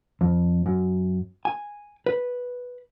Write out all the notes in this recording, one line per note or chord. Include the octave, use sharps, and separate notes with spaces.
F2
F#2
G#5
B4